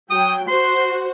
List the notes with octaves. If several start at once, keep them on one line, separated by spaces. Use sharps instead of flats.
F#3 G5 D#6
F#4 C5 C6